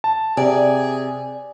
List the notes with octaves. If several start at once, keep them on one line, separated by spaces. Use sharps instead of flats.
A5
C3 G#4 D5